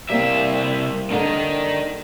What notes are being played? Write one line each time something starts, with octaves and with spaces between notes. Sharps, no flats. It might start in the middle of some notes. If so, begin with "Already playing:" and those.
C2 G3 A#3 C4 E5
D3 D#3 D4 D#4